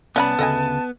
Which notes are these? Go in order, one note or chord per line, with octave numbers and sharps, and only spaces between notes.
C2 B3 C#4 D5 F#5 G#5 A5 B5
D2 C#3 A4 B4 D#5 G#5